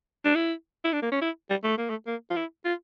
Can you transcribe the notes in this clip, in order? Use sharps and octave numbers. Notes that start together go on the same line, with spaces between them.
D4
E4
E4
D4
A#3
C#4
E4
G3
A3
A#3
A3
A#3
F4
E4
F4